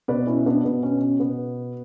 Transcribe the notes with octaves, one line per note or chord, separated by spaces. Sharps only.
B2 B4 D5
C#4 E4
B3 D4
B2 B3
C#4
C#4
B2 B3